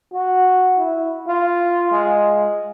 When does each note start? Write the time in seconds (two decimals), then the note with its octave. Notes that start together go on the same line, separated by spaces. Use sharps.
0.13 F#4
0.77 E4
1.27 F4
1.91 G#3